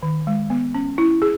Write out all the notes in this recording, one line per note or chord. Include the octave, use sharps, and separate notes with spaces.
D#3
G#3
B3
C#4
E4
G#4